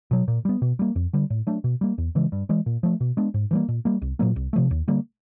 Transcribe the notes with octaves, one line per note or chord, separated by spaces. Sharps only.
B2 F#3
A#2
G3 B3
B2
G3 A#3
F2
D3 G3
A2
F#3 A3 D4
B2
G3 A#3
E2
C#3 E3 G#3
G2
E3 G#3
A#2
F3 A3
B2
G#3 B3 D4
G#2
E3 G3 A#3
A#2
G3 A#3
C2
A#2 F#3 A#3
C2
C3 F3 A3
D#2
D3 G3 A#3